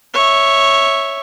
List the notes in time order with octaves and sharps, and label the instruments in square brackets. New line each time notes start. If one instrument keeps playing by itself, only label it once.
[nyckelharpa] C#5 E5